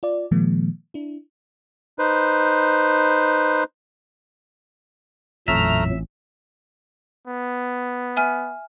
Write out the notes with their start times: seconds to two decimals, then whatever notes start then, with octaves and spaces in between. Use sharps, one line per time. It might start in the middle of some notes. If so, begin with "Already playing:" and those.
0.03 F4 D5
0.31 A#2 D#3 F3 G#3 A#3
0.94 D4 E4
1.99 D#4 B4 C5
5.48 A1 F2 A#2 F#3 A3 E5 A#5 F6
7.27 B3
8.17 E5 G#5 F6